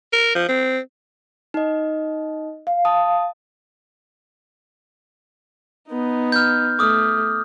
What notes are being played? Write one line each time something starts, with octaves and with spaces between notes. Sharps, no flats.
A#4
F3
C4
D#4 D#5
F5
A5 D#6
B3 D#4
F6 G6
A3 D6 D#6 F6